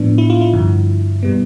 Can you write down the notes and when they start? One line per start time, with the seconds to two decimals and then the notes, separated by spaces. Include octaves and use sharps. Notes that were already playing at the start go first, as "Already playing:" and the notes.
Already playing: A2 F3 B3 D4
0.18 E4
0.30 F4
0.41 E4
0.53 G2 D3 F3
1.23 B2 G3 B3